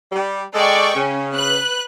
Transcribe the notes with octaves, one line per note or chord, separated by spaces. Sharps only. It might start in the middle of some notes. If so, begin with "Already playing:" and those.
G3
G#3 A4 D5 D#5 G5 C#6
C#3 C#4
B4 F#6